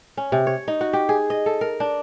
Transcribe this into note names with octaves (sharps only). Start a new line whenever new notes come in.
C#4
C3
C#5
D#4
F#4
G4
G#4
D#5
A4
A#4
D4